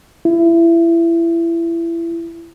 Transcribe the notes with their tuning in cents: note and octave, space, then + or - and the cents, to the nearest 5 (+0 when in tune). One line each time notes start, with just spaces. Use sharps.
E4 +25